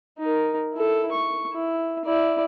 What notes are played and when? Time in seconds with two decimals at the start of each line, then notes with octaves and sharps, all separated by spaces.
0.19 D#4 A#4
0.74 E4 A4
1.11 C#6
1.53 E4
2.05 E4 D5